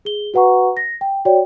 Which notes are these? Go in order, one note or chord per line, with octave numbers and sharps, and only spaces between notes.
G#4 G7
F#4 B4 F#5 A#5 C#6
A#6
G5
F#4 C#5 D5 G5